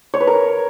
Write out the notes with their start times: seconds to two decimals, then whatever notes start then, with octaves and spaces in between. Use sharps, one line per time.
0.14 C#5
0.21 B4
0.27 A#4